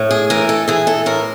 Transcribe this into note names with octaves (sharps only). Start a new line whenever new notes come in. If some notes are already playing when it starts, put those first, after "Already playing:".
Already playing: A2
G#4
E3 A#4
A4
E3 G#4
A4
A2 A#4